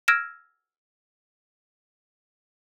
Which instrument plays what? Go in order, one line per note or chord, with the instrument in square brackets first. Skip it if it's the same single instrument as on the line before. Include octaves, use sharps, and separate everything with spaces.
[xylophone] E6 F6 G#6 A#6 D7 E7